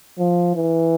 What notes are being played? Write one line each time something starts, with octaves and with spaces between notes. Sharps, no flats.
F3
E3